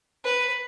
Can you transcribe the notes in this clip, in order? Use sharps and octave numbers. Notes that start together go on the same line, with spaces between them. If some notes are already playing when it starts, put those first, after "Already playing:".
B4